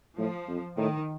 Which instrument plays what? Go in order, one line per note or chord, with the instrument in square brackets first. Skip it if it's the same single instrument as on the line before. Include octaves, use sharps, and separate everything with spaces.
[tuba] A2 [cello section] F3
[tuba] F2
[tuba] A2 [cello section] D#3